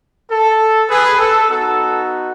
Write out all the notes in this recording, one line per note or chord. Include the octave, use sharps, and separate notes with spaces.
A4
G#4 B4
A4
B3 D#4 F#4 A4